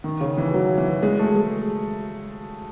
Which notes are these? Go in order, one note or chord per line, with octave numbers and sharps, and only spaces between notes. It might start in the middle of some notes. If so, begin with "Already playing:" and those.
D#3
C#3
E3
F#3
E3
G#3
A3
G#3